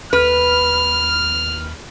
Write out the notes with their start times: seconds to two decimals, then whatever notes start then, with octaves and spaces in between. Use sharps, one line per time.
0.13 D#2 B4 F6